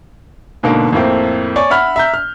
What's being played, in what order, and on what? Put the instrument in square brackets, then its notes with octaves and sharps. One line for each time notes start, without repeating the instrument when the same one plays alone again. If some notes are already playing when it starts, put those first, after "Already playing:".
[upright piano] G#2 B2 D3 A#3
F2 A2 A#3 C4
C#5 D5 G#5 C#6
E5 F#5 B5 F6
E5 A#5 G6
F6